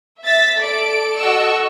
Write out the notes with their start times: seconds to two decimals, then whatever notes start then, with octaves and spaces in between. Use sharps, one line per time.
0.22 E5 A6 B6
0.57 A4 D5 D7
1.17 F#4 A4 D#5 F#5 C#6 E6